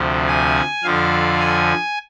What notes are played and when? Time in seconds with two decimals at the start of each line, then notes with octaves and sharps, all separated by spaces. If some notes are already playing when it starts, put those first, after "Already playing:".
Already playing: D2 C3 F3
0.27 G#5
0.84 F2 D3 F3 F5
1.39 G#5